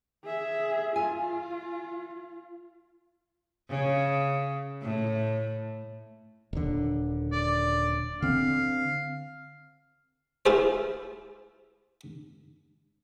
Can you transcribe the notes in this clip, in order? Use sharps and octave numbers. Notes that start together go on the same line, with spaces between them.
G#4 E5
F4 G#5
C#3
A2
D#1 D3
D5
D3 C4 F5
E4 F4 G#4 C5